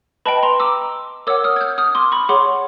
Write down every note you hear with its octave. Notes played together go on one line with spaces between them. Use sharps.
B4 D#5 G5 A5 B5
A#5 C6
D6 E6
A#4 C#5 F#5 D6 E6
D#6 F6
G#6
F6 G6
D#6 F6
C6 D6
B5 C#6
G#4 C#5 F#5 C6 D6